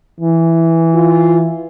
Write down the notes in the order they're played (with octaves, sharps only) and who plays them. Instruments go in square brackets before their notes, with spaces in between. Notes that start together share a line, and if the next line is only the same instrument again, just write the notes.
[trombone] E3
[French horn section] F4